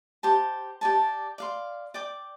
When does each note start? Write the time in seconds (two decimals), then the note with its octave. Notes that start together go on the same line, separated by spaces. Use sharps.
0.23 G4 C5 A5
0.81 G4 D5 A5
1.38 D5 F5 C6
1.94 D5 G5 D6